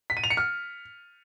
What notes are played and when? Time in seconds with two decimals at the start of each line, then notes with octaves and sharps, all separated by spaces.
0.10 B6
0.17 D#7
0.24 F7
0.30 C#7
0.37 F6